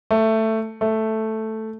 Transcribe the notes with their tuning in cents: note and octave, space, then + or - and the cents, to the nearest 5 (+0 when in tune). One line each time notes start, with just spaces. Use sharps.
A3 +10
A3 +0